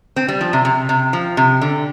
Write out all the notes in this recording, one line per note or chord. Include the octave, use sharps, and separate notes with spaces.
C4
G3
F3
C3
C3
C3
F3
C3
D3